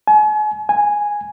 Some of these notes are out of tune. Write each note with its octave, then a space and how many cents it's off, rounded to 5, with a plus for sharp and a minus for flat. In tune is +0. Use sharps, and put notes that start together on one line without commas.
G#5 +40
G#5 -5